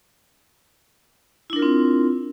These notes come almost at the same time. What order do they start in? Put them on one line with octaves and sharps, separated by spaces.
E4 D4 A#4 F4 C4